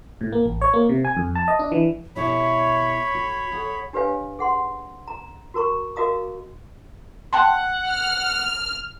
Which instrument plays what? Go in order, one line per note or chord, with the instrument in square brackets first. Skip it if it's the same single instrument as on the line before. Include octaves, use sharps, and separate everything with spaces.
[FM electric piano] A2
A#3
A1
C#5
A#3
C3
G#5
F2
A5
D#5
D4
E3
[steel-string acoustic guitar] B2 E4 G4 [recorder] C#5 [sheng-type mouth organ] B5
[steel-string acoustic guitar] F#4
G#4 F#5
[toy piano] D4 G4 B4 C#5 F5 G#5
G#4 F#5 C6
A#5
F#4 A#4 A#5 C#6
F#4 A#4 D#5 F5 A#5 D#6
[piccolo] F#5 [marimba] G5 A5 C6
[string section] F6